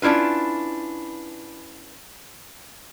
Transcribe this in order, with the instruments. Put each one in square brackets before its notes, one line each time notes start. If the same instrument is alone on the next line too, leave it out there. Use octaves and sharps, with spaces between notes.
[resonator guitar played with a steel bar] C#4 D4 E4 F4 B4